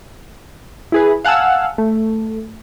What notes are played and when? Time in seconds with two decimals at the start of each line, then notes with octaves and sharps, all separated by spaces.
0.92 E4 G#4 B4
1.25 F5 F#5 G#5 A5 E6
1.78 A3